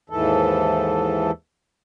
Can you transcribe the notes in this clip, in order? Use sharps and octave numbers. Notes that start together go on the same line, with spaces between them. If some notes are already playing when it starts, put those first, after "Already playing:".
D#2 G#2 E3 A4